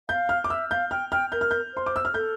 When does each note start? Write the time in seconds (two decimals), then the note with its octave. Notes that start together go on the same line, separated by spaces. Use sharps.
0.09 F5 G6
0.29 F6
0.44 D6
0.50 E5 E6
0.71 F5 G6
0.91 G5 F6
1.12 G5 F6
1.32 A#4 G6
1.41 F6
1.51 G6
1.74 C5 C6
1.86 D6
1.96 E6
2.05 F6
2.14 A4 G6